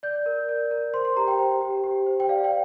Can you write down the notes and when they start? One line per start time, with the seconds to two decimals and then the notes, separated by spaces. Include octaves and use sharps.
0.03 D5 G6
0.26 A#4
0.49 D5
0.71 A#4
0.94 C5 C6
1.05 C6
1.16 G4 A#5
1.27 G5
1.39 C5
1.61 G4
1.84 G4
2.07 C5
2.20 G5
2.29 D5 F5
2.44 G5